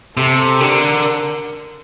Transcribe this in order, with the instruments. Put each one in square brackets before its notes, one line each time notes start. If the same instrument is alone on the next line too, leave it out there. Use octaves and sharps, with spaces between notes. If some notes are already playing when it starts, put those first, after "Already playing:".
[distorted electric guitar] C3 [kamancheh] A4
[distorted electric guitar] D3 [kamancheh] A#4